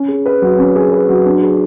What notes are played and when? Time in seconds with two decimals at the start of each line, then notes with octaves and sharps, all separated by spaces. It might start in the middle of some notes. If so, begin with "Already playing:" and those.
Already playing: C#4
0.08 G#4
0.26 B4
0.42 F#3
0.59 C#4
0.75 G#4
0.92 B4
1.09 F#3
1.26 D4
1.42 G#4